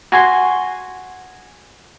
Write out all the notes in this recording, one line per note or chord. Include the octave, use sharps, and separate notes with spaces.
F#4 G#5 C6